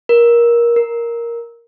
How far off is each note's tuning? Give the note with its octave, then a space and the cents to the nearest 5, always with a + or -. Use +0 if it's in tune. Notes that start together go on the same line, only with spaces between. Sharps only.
A#4 +20
A#4 +5